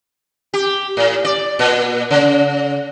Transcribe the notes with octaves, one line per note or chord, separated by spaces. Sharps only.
G4
A2
D5
A#2
C#3